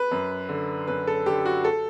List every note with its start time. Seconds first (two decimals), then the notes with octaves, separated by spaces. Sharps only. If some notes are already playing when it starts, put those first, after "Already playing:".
Already playing: B4
0.11 F#2
0.49 D3
0.87 F#2 B4
1.07 A4
1.26 D3 G4
1.45 F#4
1.64 A4